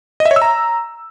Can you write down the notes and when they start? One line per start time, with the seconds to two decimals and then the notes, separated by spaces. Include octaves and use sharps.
0.20 D#5
0.25 E5
0.31 C#5
0.36 E6
0.42 A#5